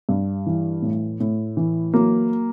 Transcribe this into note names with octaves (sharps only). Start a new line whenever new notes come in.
G2
E3
A2
A2
E3
F#3 A#3